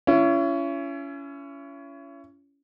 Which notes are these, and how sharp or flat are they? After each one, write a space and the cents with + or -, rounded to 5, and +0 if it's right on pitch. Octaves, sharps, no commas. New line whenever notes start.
C#4 +20 E4 +40